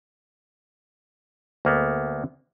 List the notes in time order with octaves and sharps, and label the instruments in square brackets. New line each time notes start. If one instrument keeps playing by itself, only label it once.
[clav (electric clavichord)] D2 A#3 B3